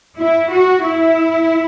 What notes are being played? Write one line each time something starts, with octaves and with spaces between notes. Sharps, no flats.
E4
F#4
E4